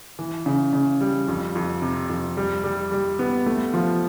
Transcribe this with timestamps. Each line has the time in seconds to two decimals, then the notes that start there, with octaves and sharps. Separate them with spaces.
0.19 E3
0.46 C#3
0.73 C#3
1.01 G3
1.28 F2
1.55 F2
1.82 C3
2.09 F2
2.37 G3
2.64 G3
2.92 G3
3.19 B3
3.46 A3
3.74 F3